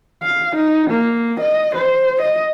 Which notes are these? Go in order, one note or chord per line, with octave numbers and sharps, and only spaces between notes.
F5
D#4
A#3
D#5
C5
D#5